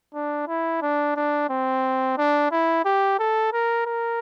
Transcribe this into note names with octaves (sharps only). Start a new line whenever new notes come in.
D4
E4
D4
D4
C4
D4
E4
G4
A4
A#4
A#4